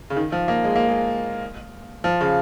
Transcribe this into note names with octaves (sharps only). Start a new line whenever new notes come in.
C#3
D#3
F3
A#3
G#3
A#3
G#3
F3
C#3